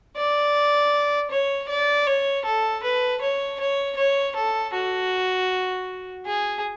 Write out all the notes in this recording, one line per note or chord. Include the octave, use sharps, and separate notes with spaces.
D5
C#5
D5
C#5
A4
B4
C#5
C#5
C#5
A4
F#4
G#4